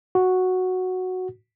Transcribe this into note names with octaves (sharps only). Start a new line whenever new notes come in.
F#4